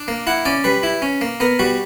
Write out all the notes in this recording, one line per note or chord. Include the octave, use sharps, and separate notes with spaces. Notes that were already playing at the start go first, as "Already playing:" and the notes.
Already playing: D4
A#3
E4 F#5
C#4 D5
G3 B4
E4
C#4
A#3
B3 A#4
G3 F#4